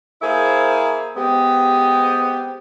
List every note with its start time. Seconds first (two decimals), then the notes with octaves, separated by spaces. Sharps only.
0.22 A#3 E4 G#4 A#4 C5
1.17 G#3 B3 C4 G4